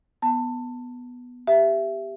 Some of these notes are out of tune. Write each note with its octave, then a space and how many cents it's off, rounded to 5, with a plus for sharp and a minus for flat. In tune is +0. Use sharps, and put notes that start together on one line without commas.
B3 +0 A5 +20
G4 +10 E5 +15